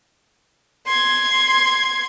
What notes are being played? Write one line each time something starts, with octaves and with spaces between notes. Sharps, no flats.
C6 G#6